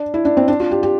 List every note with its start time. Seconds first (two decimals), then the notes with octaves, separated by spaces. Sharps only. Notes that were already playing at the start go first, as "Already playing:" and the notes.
Already playing: D4
0.14 E4
0.25 D4
0.37 C4
0.48 D4
0.60 F4
0.71 G4
0.83 G4